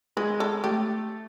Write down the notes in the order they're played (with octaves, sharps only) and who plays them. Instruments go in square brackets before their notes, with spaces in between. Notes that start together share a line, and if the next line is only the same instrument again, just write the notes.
[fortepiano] G#3 [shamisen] B4
[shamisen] A4
[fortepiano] A3 [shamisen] G4